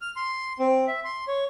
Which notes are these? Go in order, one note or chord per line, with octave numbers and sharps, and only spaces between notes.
F6
C6
C4
E5
C6
C#5